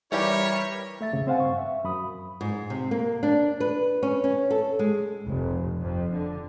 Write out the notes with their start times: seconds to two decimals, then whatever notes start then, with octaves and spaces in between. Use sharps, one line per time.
0.12 E3 G3 E4 G4 A#4 C#5
1.01 A3 E5 A6
1.13 E2 G#2 C#3
1.27 C4 C5 F5 F#5 G#5
1.40 G2 C#6
1.58 E5
1.84 F#2 B5 D#6
2.41 G#2
2.70 C3
2.91 A#3
3.23 D4
3.60 B4
4.03 C#4
4.24 C#4
4.51 A4
4.79 G#3
5.26 F1
5.81 F2
6.12 D3